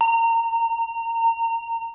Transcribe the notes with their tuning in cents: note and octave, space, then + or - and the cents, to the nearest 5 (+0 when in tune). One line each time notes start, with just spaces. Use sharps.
A#5 -25